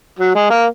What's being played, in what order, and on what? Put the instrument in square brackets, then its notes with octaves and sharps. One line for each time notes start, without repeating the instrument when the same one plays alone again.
[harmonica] F#3
G#3
A#3